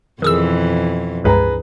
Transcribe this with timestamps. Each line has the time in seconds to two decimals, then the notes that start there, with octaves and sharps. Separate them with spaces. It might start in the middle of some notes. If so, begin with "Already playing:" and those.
0.22 F2 B2 D#3 E3 G#4 E6
1.24 C#2 G2 G#4 B4 A#5